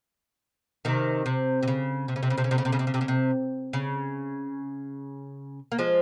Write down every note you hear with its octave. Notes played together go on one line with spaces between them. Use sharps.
C3 D#3
C3
C3
C#3
C3
C#3
C3
C#3
C3
C#3
C3
C#3
C3
C#3
C3
C#3
C3
C#3
C3
C#3
A#3
F3 G#3